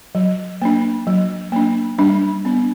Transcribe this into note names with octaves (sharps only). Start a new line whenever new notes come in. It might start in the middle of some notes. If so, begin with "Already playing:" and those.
F#3
A#3 D4
F#3
A#3 D4
G3 D4
B3 D4